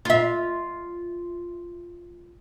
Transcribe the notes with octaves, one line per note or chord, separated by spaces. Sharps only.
F4 E5